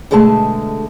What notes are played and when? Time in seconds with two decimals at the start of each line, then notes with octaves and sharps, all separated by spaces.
0.11 B2 D3 G#3 A3 A5